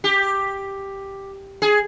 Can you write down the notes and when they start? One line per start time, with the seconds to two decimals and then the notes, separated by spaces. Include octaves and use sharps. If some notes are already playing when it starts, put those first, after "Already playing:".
0.04 G4
1.62 G#4